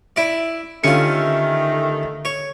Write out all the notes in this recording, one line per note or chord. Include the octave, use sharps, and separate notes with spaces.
E4 D5
D3 D#3 A3 C#4 F4 G4 C#7
C#5